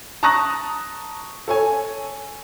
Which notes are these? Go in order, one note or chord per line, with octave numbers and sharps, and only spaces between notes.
A5 A#5 C#6 D#6 F#6 A#6
A4 C#5 G#5